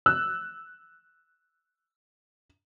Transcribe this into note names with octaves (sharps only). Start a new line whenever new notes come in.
E6 F#6